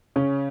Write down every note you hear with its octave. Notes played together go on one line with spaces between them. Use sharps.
C#3 C#4